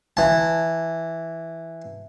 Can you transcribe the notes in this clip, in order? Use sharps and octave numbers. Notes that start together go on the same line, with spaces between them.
E3 A5